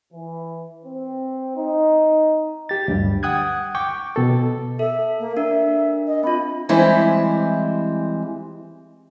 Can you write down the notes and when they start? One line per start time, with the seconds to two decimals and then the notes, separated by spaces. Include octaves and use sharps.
0.13 E3
0.85 C4
1.56 D#4
2.69 G4 A6
2.88 D2 G2 G3
3.23 F#5 G5 D#6 F#6 G#6
3.75 G5 C#6 D6
4.16 B2 A4
4.79 A4 E5
5.20 A#3
5.37 D4 A#4 E5
6.07 D#5
6.23 C4 F4 B5
6.69 E3 G3 G#3 C4 E4